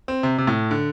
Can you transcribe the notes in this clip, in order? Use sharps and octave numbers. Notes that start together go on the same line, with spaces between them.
C4
C3
C3
A2
D3